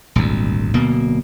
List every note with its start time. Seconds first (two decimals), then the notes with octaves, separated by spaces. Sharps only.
0.15 D#1 G#1 D2
0.74 D1 B2 A#3